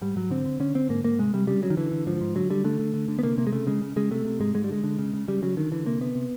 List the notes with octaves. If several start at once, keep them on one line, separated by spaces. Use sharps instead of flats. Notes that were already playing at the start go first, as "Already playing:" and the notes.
G#2 G3
G#2 F#3
D3 C4
D3
D3 C#4
D3 C4
G#2 A#3
G#2 A#3
C3 G#3
C3 G3
C#3 G3
C#3 F#3
D#3
D3 E3
D3
G#2 F3
G#2
D3 F#3
D3 G3
D3 A3
D3
D3
D3
B3
C3 A#3
C3 A#3
G#3
C#3 A3
C#3 G#3
C#3
C#3 G#3
C3 A3
C3
G#2 G#3
G#2 G#3
G3
D3 G#3
D3
C#3
C#3
C#3 G3
C#3 F#3
D3 D#3
D3 E3
C3 A#3
C3 B3
C3